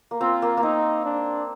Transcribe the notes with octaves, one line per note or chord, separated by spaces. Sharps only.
A#3
C4 F4
A#3
A#3
C4 D#4
D4